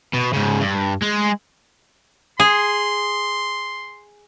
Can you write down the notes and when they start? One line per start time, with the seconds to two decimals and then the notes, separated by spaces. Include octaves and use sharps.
0.14 B2
0.33 G#2 C#3
0.61 G2
1.02 G#3
2.40 G#4 C6